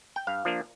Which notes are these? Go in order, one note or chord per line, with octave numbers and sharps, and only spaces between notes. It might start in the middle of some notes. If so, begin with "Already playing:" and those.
G5
G2 F5
F3 A#3 D4